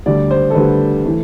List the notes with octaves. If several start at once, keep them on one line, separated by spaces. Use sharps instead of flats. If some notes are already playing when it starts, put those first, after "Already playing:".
D2 D3 G3 D5
C5
A4
D2 D3 G3 B4
E3 A3